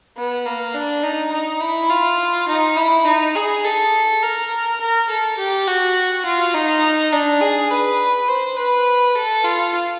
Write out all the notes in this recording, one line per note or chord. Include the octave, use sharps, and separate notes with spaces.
B3
A#3
D4
D#4
D#4
E4
F4
D#4
E4
D#4
G#4
A4
A#4
A#4
A4
G4
F#4
F4
D#4
D4
G#4
B4
C5
B4
A4
F4